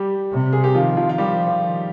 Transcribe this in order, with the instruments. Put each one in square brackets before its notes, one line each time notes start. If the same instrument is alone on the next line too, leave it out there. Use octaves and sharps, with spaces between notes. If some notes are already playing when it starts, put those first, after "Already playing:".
Already playing: [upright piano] G3 G4
[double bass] C3
[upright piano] G#4
G4
[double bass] D#3 [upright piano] F3 F4
[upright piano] F3 F4
F4
[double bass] F3 [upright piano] G3 G4
[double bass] D#3